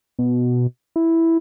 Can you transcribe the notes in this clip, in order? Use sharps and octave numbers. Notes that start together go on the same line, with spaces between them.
B2
E4